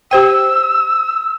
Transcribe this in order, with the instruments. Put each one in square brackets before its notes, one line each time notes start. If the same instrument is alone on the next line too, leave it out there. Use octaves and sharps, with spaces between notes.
[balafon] G4 C5 G5 [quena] E6